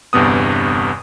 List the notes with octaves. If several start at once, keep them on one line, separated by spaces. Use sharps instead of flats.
G1 E2 G2 C3 B3 D#6